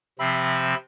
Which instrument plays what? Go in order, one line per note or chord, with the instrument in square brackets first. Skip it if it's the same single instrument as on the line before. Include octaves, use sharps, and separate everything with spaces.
[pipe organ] C3 F3 C4 [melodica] E5 B5